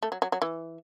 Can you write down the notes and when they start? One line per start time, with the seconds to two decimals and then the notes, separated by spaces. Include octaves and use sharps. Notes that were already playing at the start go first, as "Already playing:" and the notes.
0.03 A3
0.12 F#3
0.22 F#3
0.32 F#3
0.42 E3